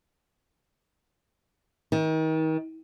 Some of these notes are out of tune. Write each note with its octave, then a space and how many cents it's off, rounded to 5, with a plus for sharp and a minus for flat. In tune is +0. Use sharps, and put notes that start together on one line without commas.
D#3 +35